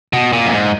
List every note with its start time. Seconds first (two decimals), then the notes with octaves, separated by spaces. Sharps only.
0.13 B2
0.33 A#2
0.46 F#2
0.52 G#2